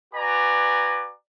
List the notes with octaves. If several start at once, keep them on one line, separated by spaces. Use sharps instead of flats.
F#4 B4 D5 G#5 A#5 D6